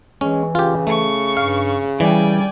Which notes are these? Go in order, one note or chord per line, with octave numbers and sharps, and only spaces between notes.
E3 G#3 C#4
C#3 F4 G4
A3 C#6
G2 F5
E3 G3 D5 G5 G#5